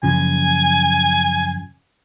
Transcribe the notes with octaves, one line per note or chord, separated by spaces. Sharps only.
F#2 C#3 F3 G#5